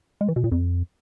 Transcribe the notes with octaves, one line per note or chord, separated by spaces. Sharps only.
G#3
E3
B2
A#2
F2